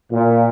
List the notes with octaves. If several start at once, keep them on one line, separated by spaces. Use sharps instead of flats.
A#2